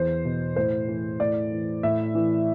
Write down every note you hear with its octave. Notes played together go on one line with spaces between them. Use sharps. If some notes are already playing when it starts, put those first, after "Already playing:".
Already playing: E2 C5
B2
A2 C5
E3
A2 D5
E3
A2 E5
E3